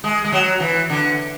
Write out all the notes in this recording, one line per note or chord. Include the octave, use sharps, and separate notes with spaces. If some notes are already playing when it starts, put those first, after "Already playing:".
G#3
G#3
F#3
E3
D3